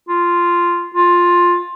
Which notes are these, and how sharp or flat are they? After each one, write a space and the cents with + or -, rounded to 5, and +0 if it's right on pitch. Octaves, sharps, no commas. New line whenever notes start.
F4 -5
F4 +10